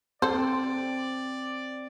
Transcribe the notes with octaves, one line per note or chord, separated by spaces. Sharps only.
C4 A4 C5 D5